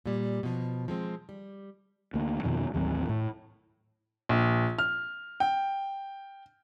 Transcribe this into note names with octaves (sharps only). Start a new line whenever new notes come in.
A#2 G3
B2 F3
F3 G#3 C4
G3
D2 A#3
F2 B2 D#3 F3
A1 D#2 F#3 C4
A2
A#1
F6
G5